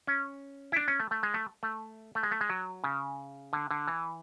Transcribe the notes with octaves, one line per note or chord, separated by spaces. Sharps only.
C#4
E4
D4
C#4
A3
A3
G#3
A3
A3
A3
G#3
A3
G#3
F#3
C#3
D3
D3
E3